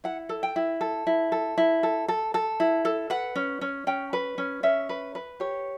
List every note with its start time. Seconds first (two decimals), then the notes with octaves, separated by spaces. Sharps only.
0.04 E4 F#5
0.29 A4
0.43 G5
0.56 E4
0.81 A4
1.07 E4
1.32 A4
1.58 E4
1.83 A4
2.08 A4
2.34 A4
2.60 E4
2.85 A4
3.10 B4 F#5
3.36 C#4
3.61 C#4
3.87 C#4 G5
4.13 B4
4.38 C#4
4.63 C#4 E5
4.89 B4
5.15 B4
5.40 G4 C#5